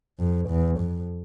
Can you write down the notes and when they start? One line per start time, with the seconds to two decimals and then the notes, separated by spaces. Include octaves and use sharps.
0.20 F2
0.49 E2
0.80 F2